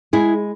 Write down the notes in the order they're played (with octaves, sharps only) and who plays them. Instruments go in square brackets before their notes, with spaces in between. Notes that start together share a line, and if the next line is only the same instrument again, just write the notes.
[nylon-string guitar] G#3 E4 G#4